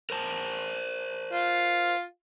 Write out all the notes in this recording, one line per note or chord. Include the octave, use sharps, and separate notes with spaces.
A#4 C5 A5
F4